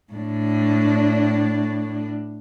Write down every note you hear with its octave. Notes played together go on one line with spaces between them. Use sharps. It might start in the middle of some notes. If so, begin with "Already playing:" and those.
A2 D4